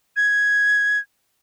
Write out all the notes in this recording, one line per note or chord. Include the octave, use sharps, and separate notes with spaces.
G#6